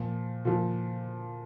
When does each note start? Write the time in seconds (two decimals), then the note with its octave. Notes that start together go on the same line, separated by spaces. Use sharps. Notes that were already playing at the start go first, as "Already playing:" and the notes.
Already playing: A#2 F3
0.45 A#2 F3